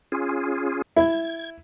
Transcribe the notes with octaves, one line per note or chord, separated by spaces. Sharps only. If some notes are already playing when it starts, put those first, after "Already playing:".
C#4 F4 G#4
E4 G#6